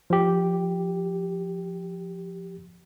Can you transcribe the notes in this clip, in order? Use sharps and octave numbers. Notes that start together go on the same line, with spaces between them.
F3 G4